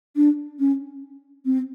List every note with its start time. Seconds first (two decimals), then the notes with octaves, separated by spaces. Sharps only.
0.16 D4
0.59 C#4
1.45 C4